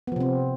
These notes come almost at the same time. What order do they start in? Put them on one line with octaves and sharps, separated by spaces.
B3 F3 C3 C4